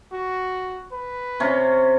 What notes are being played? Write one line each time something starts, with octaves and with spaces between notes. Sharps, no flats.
F#4
B4
C3 C#4